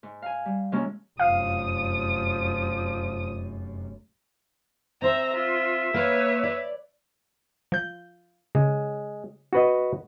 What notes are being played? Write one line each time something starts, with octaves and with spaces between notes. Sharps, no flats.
G#2
F5 G#5
G3
C3 F3 G#3 A#3 C#4
F1 F#2 F3 F5 D#6
C4 C5 E5 A#5
F4 E5
A#3 B4 C#5
D5
F3 G6
C#3 G#3
F#4 B4 D#5